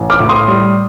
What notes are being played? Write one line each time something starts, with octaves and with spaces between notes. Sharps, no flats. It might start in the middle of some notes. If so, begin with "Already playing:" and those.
Already playing: A1
D6 F6
A2
C6 D#6
G3